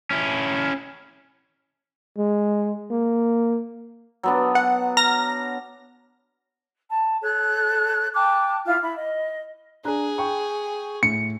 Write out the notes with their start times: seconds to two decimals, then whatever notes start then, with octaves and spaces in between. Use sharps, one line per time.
0.10 C#4 E4
2.18 G#3
2.91 A#3
4.23 F#3 B3 D4
4.55 F#5
4.97 A#5 F6 A#6
6.87 A5
7.21 A4 C#5 F#6
8.13 G5 A5 D6 F#6
8.66 E4 F4 F5 F6
8.81 E4 B5
8.95 D#5
9.85 D4 G#4 A#5 F#6
10.18 G5 B5 C#6
11.03 A2 C#7